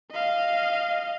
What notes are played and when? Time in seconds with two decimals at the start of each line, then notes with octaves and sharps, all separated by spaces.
0.12 D#5 F5